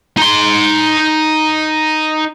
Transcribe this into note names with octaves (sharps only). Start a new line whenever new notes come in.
D#4 C6